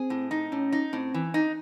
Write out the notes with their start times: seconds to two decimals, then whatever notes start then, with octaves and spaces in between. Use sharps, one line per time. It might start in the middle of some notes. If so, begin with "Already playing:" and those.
Already playing: C4 G#4
0.10 A2
0.31 D#4
0.52 A2 C#4
0.72 D#4
0.93 A2 C4
1.14 E3
1.34 D#4